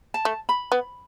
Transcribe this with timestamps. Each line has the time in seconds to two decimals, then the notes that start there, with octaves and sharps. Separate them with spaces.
0.14 A5
0.25 A3
0.49 B5
0.72 B3